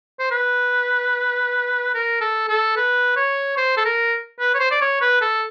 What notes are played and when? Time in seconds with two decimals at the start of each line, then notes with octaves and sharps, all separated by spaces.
0.19 C5
0.31 B4
1.94 A#4
2.21 A4
2.49 A4
2.77 B4
3.16 C#5
3.57 C5
3.77 A4
3.85 A#4
4.40 B4
4.54 C#5
4.60 C5
4.71 D5
4.81 C#5
5.01 B4
5.22 A4